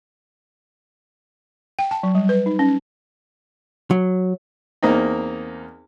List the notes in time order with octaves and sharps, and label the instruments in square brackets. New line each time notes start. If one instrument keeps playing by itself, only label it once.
[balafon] G5
A5
F#3
G3
B4
D#4
C#4
[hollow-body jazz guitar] F#3
[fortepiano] E2 A#3 C4 D#4